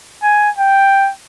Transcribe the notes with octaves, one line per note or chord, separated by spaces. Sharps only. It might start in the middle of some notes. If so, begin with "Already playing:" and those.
G#5
G5